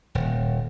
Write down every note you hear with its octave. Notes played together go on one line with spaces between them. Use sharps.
D#1